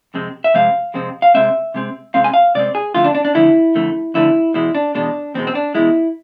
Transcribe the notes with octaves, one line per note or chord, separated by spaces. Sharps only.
F2 C3 G#3 C4
E5
F2 C3 G#3 C4 F5
F2 C3 G#3 C4
F5
C3 G#3 C4 E5
C3 G#3 C4
C3 G#3 C4 F5
G#5
F5
C3 G#3 C4 D5
G#4
F2 D3 A3 F4
D4
D4
D4
F2 D3 A3 E4
F2 D3 A3
F2 D3 A3 E4
E2 B2 G#3 E4
D4
E2 B2 G#3 D4
E2 B2 G#3 C4
C4
D4
E2 B2 G#3 E4